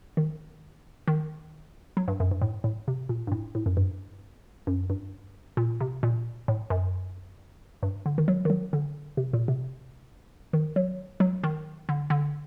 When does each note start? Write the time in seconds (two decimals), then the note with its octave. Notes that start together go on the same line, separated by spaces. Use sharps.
0.17 D#3
1.08 D#3
1.97 F#3
2.08 G2
2.20 F#2
2.31 G2
2.41 A2
2.64 A2
2.88 C3
3.09 A#2
3.27 G2
3.32 A2
3.55 A2
3.66 F#2
3.77 G2
4.67 F#2
4.90 G2
5.57 A#2
5.81 C3
6.03 A#2
6.48 A2
6.70 F#2
7.83 G2
8.06 D3
8.18 D#3
8.28 F#3
8.45 D#3
8.50 F#3
8.73 D3
9.17 C3
9.33 A#2
9.48 C3
10.53 D#3
10.76 F#3
11.20 F#3
11.44 D#3
11.89 D3
12.10 D3